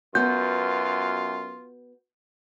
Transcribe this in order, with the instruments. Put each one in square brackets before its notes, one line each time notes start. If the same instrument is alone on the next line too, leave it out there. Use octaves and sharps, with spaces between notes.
[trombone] F#2 [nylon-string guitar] B3 F#4 [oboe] F4 [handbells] G6